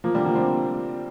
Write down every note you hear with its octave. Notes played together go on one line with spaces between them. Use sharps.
F3 A#3
D3 G3
F3 A#3
G3 C4